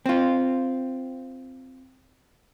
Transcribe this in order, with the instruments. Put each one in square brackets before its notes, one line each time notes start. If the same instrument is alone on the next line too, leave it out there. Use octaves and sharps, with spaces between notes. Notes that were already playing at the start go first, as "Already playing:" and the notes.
[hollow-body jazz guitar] C4 F4